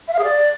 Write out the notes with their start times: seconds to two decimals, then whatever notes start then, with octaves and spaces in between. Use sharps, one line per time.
0.08 E5
0.13 F5
0.19 G#4
0.24 D5